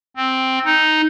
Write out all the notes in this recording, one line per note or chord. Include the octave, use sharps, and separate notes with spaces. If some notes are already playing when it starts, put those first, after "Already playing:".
C4
D#4